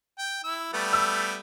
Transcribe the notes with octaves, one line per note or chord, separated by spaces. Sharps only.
G5
E4 E6
G3 A3 B3
E6